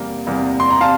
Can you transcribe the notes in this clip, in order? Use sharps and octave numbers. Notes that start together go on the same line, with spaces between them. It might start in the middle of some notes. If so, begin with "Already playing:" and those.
Already playing: E2 C3 G3 A#3
E2 C3 G3 A#3
C6
A#5
C3 F5 A5